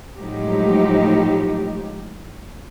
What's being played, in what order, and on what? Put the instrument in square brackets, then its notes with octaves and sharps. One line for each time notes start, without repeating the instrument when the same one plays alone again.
[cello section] A2 F3 F#3 G#3 D#4 G4